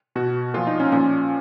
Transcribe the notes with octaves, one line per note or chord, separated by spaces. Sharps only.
B2 F#4
A#2 F3 F4
D#4
C#4
A#2 F3 C#4